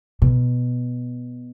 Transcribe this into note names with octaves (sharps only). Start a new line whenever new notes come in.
B2